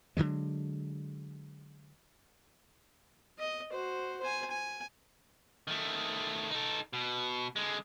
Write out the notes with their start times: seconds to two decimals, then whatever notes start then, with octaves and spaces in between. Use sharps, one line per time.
0.17 D3 D#3 F#3 G#3
3.39 D#5
3.72 F#4 C5
4.20 C5 G#5
4.51 G#5
5.68 D#3 A3
6.50 D#4 A4
6.93 B2
7.56 D3 G#3